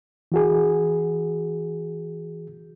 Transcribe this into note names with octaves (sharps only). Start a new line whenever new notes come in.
E3 F#4 G#4